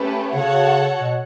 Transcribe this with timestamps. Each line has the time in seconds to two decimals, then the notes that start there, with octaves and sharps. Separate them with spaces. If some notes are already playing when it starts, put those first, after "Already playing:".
Already playing: A3 C#4 G4 B4
0.34 C#3 F#4 A4 C#5 F#5
1.01 B2